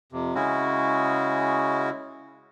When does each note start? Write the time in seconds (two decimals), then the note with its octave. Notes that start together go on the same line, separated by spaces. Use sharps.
0.12 F2 C3
0.35 C#3 G#3 C#4 E4 F#4